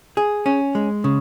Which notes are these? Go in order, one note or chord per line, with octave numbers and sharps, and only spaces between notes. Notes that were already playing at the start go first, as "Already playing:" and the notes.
G#4
C#4
G#3
C#3